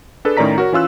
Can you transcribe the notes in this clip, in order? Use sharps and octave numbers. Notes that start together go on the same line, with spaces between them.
D4 G#4 A4 B4
A2 D#3 C#4 D5 A#5 B6
F#4 A#4 C#5
E3 C#4 F4 E6 F#6